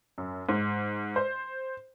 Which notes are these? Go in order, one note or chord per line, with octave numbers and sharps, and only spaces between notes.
F#2
G#2
C5